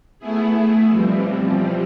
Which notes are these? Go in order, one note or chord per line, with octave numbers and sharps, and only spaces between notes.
A3 B3 E4 G#4
B2 E3 F3 G3 C4